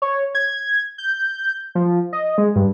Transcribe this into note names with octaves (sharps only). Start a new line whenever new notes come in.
C#5
G#6
G6
F3
D#5
G#3
G2